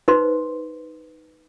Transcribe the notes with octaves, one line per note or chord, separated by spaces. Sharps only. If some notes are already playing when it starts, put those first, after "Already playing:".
D#4 B4 C5 C6